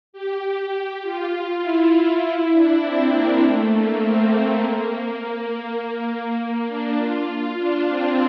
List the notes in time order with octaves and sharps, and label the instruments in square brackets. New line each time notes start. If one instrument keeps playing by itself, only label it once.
[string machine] G4
G4
F4
E4
F4
E4
D4
C4
A#3
A3
A#3
C4
C4
A#3
A#3
D4
F4
D4
C4